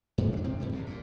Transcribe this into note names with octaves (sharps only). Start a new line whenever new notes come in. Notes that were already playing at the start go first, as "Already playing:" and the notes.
G2 A#2 F#3 A3
A3 D4
C3 D#3 C4
F#2 B2 E3 G3
A#1 G#2 C3
F#2 A#2